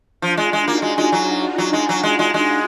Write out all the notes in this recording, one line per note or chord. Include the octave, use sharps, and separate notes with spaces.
F3 D4 F4
G#3
G#3
A#3 D#4 F#4
G#3
G#3
F#3
F#3
G#3
F#3
G#3
G#3
G#3